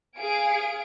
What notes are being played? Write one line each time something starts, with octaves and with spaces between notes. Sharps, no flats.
G#4 F5 G#5 D7